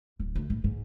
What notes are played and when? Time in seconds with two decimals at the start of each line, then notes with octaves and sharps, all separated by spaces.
0.20 D1
0.35 D2
0.50 A2
0.64 G#2